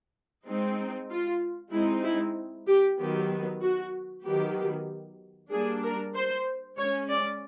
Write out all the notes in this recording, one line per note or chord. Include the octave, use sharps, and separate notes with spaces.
G#3 C4 D#4
F4
G#3 C4 D#4 E4
E4
G4
D#3 F#3 B3 G4
F#4
D#3 F#3 B3 G4
G3 A#3 D4 G#4
A#4
C5
G#3 C#4 C#5
D5